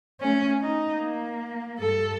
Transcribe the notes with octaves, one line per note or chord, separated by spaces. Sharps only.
A3 C#4
D#4
A#3
G2 A4